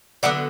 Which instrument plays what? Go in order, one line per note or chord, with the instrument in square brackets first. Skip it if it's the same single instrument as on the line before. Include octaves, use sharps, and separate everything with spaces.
[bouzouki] D3 F#3 B3 D5 F#5